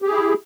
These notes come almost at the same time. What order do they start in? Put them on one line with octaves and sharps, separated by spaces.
G4 G#4 E4